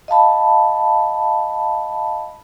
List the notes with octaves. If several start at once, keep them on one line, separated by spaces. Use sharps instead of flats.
D#5 F5 A5 B5